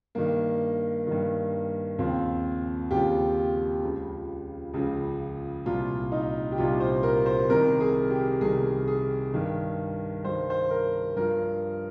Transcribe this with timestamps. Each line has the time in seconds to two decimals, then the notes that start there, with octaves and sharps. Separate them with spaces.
0.15 G2 D#3 A#3
1.07 G2 D#3
1.99 D#2 C#3 F3 C4
2.91 D#2 C#3 F3 G4
3.83 C#2 C#3 F3
4.74 C#2 C#3 F3
5.66 C2 A#2 F3 F4
6.12 D#4
6.52 G4
6.57 C2 A#2 F3 F4
6.80 C5
7.03 A#4
7.26 C5
7.49 C2 C3 D#3 A#4
7.80 G#4
8.11 G4
8.41 C2 C3 D#3 G#4
8.88 G#4
9.33 G2 D#3
10.24 G2 D#3 C5
10.50 C5
10.70 A#4
11.16 G2 F3 A#4